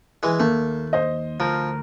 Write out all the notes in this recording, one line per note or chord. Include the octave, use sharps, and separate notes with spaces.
E3 G#3
D#2 A3 A#3
C5 D#5
D2 F3 A#4